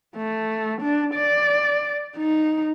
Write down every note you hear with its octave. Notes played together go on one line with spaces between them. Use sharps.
A3
D4
D5
D#4